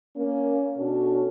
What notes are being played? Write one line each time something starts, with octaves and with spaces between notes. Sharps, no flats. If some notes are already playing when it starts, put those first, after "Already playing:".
A#3 C#4
B2 C#4 D4 F#4 A4